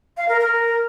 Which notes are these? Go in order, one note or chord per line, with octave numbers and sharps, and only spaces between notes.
F5
A#4
A#4